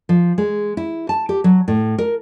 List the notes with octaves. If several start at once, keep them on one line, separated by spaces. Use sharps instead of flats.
F3
G#3
E4
A5
G4
F#3
A2
A#4